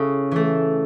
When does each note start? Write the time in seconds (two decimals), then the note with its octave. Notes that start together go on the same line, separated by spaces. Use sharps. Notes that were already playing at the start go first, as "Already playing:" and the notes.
Already playing: C#3 C#4 E4 A4
0.32 E3 A3